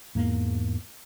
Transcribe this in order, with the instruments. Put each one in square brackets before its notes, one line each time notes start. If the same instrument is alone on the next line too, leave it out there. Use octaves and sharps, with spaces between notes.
[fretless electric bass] E2 G#2 A#3